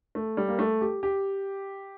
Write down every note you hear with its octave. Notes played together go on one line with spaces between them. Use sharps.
A3
G3
A#3
A3
G4
G4